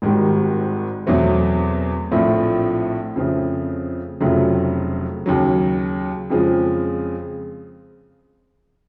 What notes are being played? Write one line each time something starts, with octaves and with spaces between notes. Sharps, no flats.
G#1 G#2 D#3 G3
E2 B2 F#3 A3 C4
A#1 A2 F3 A3 C4
F2 C#3 F3 A3
F1 F2 C#3 F#3 A3
D#2 C#3 F#3
F2 C#3 F3 G#3